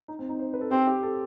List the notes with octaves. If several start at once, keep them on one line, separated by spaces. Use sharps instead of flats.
D#4
C4
D#4
C5
B4
A4
C4 G4
G4
A4